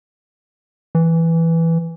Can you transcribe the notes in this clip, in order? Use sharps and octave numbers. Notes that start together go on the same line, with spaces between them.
E3